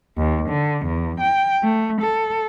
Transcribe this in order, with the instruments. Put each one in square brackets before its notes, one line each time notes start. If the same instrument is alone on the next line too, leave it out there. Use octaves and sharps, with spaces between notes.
[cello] D#2
D3
E2
G5
A3
A4